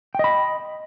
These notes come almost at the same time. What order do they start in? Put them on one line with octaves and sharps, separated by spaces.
G5 D#5 B5